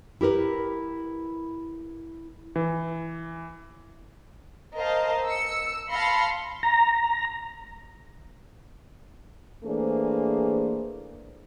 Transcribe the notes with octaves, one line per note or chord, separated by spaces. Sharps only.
E4 G4 A#4 B4
E3
A#4 C5 D#5 F5 A5
E6 C#7
F5 A5 B5 C6 A#6 C#7
A#5
E3 A3 A#3 D4 G#4 C5